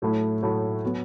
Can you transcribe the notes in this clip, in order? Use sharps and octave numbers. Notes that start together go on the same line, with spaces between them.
A2 F#3 A3 E4
A2 F#3 A3 E4
F#3 B3